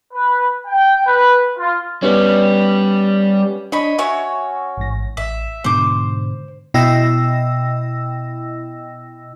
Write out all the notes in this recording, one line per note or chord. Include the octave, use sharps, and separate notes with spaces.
B4
G5
B4
F4
G3 B3 C#4
D4 C#5 D#5 B5
C#4 F#4 C#5 E5
A1 G#2 A#6
A1 E5
G#2 B2 D3 C5 D6
B2 E4 D#5 G5 E6 A#6